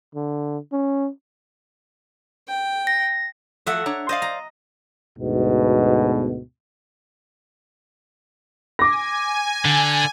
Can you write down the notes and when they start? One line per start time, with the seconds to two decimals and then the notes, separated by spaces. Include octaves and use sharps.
0.15 D3
0.72 C#4
2.48 G5
2.87 A#6
3.67 F3 F#3 A3 E5 F#5
3.86 D4 C#5 A#5
4.09 C5 D5 D#5 F5
4.22 A#5
5.18 D2 G#2 B2
8.79 G#5 D6 A#6
9.65 D3